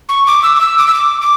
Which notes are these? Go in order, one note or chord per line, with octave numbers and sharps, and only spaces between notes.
C#6
D6
E6
D6
E6
D6
E6
D6
D6